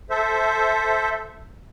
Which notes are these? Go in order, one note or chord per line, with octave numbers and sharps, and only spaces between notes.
A4 C5 E5